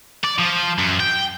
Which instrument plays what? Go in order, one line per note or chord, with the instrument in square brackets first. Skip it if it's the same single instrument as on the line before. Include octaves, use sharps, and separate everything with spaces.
[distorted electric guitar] D5
F3
F#2
G5